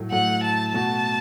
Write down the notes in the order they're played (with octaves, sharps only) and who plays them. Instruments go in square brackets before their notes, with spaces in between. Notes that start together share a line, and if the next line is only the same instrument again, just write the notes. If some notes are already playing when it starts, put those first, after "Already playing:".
Already playing: [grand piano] A2 F#3 A3
[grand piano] A2 F#3 A3 [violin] F#5
[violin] A5
[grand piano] B2 A3 F#4 [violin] A5